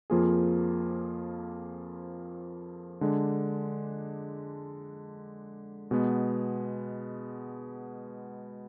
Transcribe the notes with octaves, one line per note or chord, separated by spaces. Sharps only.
F2 F3 A#3 F4 G#4
D3 G#3 D4
B2 G#3 B3